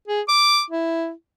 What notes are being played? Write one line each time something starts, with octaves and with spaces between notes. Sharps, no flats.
G#4
D6
E4